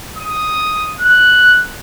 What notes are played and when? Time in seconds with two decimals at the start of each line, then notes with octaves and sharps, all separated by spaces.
0.18 D#6
1.00 F#6